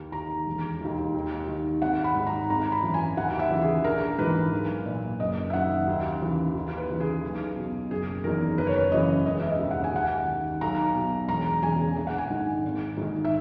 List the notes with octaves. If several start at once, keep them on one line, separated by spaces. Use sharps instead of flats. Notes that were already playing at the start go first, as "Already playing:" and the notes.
Already playing: D#2
D#3 A#5
E1
D#2 D#3
D#2
D#3
G#1 F#5
B5
G#2 D#3
A#5
G#1 A#5
B5
F#2 E3
G#5
D#2 F#5
E5
C#3 E3
G#4
A#1 A#4
G#2 E3 B4
B1
A#2
F#1 D#5
E5
F#2 D#3 F#5
D#2
C#3 E3
D#2
B4
C#3 E3
G#4
B1
B2
F#1 G#4
E2 D#3 A#4
F#1 B4
C#5
B4
F#2 C#3 E3 D#5
E1 D#5
E5
D#5
D#2 C#3
F#5
G#5
D#2 F#5
D#3
B1 A#5
B2
E1 A#5
E2 C#3 G#5
A#1 G#5
F#5
G#5
G#2 D#3
G#1
G#2 D#3
E5